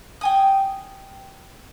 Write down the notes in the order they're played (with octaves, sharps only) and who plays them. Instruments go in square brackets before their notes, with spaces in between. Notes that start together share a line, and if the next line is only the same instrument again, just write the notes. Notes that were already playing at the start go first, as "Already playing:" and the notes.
[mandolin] G5 G#5 D#6